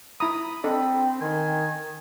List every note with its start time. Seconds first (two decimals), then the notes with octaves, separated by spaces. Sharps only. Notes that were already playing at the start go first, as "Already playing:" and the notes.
0.20 E4 A#5 B5 D#6
0.64 C4 D4 A4 D#5
1.21 D#3 G#5